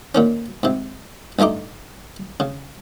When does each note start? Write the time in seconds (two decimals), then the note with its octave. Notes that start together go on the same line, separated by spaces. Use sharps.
0.15 A#2 D#3 C#4
0.63 G#2 C3
1.39 A1 G2 A3 D#4 D6
2.40 C#3